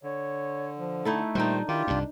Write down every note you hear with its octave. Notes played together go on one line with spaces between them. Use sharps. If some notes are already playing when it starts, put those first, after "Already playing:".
D3 C#5
F3
A3 D#4 E4 A4
A#2 D#3 G3 D4 D#4 C5
D#3 E4 F4 G4
C2 G2 D4